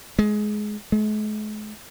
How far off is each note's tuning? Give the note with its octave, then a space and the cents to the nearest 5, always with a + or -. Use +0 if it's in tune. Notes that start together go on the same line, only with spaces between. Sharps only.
G#3 +20
G#3 +45